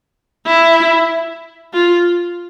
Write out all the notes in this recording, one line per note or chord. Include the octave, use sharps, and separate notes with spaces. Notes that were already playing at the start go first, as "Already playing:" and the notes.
E4
F4